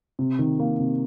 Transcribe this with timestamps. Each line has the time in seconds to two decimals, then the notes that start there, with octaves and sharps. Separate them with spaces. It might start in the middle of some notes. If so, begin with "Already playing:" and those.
0.19 C3
0.39 D#3
0.59 A#3
0.80 C3